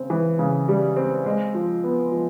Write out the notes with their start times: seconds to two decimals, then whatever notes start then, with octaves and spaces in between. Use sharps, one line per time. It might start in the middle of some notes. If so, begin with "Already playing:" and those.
Already playing: C#3 C4
0.10 E3
0.39 C#3
0.68 G3
0.96 C4
1.26 G#3
1.55 F3
1.84 B3
2.12 F3